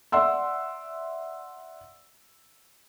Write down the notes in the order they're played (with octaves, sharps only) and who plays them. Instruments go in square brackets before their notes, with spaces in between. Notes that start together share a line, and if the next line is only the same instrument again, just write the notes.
[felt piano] D5 E5 F#5 C6 E6